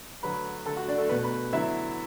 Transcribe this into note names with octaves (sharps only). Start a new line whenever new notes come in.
D3 F#3 A3 B4 B5
D3 A3 A4 A5
F#4 F#5
D4 D5
A3 A4
B2 A3 B3 B4
B4 B5
D3 F#3 B3 E4 E5